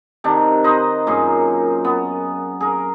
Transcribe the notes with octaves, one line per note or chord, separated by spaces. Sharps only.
C3 D#3 D4
D#4 B4 C5 D#5
F#2 A#2 G#4 C6
B3
G#4 A#4